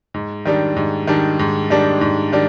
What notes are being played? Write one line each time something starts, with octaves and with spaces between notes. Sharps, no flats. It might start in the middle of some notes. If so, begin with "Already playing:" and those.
G#2
D#3 G3 D4
G#2
D#3 G3 D4
G#2
D#3 G3 D4
G#2
D#3 G3 D4